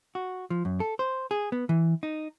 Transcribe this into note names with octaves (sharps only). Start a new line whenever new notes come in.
F#4
F3
F#2
A4
C5
G#4
B3
E3
D#4